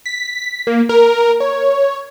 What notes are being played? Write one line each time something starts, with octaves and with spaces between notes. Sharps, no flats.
B6
A#3
A#4
C#5